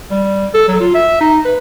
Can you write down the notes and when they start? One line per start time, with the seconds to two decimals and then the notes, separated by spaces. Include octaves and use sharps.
0.11 G3
0.54 A4
0.68 F#3
0.80 F4
0.94 E5
1.21 D#4
1.45 B4